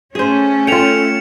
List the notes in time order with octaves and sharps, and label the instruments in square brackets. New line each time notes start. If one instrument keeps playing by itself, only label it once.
[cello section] A3 C#4 [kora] G#4 C5
[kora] F4 G5 [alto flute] A4 [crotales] C#7 E7 F7